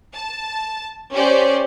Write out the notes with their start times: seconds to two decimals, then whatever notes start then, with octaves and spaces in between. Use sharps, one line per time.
0.14 A5
1.13 C#4 G4 C5 D5